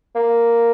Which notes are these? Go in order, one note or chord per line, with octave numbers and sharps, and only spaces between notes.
A#3